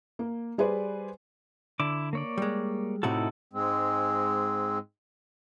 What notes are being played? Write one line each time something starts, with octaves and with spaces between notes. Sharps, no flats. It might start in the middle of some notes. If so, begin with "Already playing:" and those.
A#3
G3 G#4 B4 C5 D5
D3 E4 D6
A#3 C#5 D5
G3 G#3
A2 C3 D#4 E4 F#4 A4
G#2 G#3 C4